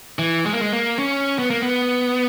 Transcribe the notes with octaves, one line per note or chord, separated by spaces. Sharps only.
E3
G#3
A#3
G#3
A#3
C#4
B3
A#3
B3